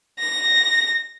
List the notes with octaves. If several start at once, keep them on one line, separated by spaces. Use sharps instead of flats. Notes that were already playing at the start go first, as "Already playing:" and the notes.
A#6